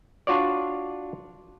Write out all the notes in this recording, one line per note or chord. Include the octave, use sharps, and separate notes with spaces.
D4 F4 F#4 C#5 D5